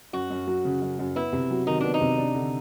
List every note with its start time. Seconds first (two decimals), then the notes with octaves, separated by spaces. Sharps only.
0.13 F#2 F#4
0.30 F#2
0.47 F#3
0.65 C#3
0.82 F#2
0.99 F#2
1.16 B3 E4
1.33 C3
1.51 F#3
1.67 D#3 D#4
1.80 B3 D4
1.94 D#4
2.01 C3
2.18 D4
2.35 D3